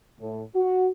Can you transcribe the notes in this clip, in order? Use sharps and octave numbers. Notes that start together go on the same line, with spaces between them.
A2
F#4